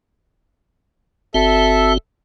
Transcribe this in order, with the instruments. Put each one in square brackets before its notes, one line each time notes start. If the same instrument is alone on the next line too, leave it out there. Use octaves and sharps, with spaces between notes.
[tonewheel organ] G1 C4 F#4 [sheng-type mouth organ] A4 E5